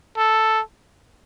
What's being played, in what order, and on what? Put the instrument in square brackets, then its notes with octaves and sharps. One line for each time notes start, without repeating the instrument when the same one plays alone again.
[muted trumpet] A4